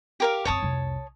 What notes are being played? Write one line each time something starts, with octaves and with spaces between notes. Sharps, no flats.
G4 A#4 F5
F#2 C4 C#5 A5 D#6
C2 F2